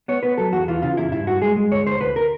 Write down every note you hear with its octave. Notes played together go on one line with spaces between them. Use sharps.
B3 C#5
B3 B4
F#3 A4
E2 F#4
E3 F4
C#3 F4
E2 E4
G2 E4
G2 F#4
G#3 G#4
G#3
D2 C#5
D2 C5
D2 B4
A#4